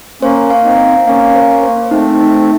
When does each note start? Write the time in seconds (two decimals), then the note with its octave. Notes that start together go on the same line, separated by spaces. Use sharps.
0.22 A#3 C#4 C5
0.50 F5
0.64 C4 D#4
0.79 C5
1.06 A#3 C#4 F5
1.36 C5
1.63 C5
1.91 A3 C4 D#4
2.20 D#4